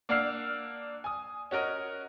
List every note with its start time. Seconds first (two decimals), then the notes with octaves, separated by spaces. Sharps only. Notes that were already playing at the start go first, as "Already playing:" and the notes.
0.09 A#3 D4 F#5 E6 F6 C7
1.04 G#5 D#6
1.51 C#4 F#4 A#4 D#5